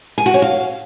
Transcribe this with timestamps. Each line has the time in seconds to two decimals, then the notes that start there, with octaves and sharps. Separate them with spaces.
0.18 G#5
0.26 F#4
0.34 C#5
0.42 F5